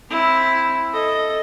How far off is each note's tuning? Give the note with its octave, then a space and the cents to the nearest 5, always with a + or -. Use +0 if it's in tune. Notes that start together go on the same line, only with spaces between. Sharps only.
C4 +0 E4 +0
A4 +0 D#5 +0